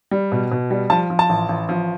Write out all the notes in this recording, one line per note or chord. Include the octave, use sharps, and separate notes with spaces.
G3
B2
B2
G3
F3 A5
F3
A5
A1
A1
F3